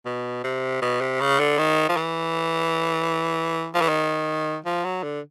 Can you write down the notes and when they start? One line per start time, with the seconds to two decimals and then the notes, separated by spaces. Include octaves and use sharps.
0.05 B2
0.44 C3
0.82 B2
1.01 C3
1.21 C#3
1.40 D3
1.58 D#3
1.89 F3
1.97 E3
3.74 F3
3.81 E3
3.88 D#3
4.65 F3
4.85 F#3
5.03 D3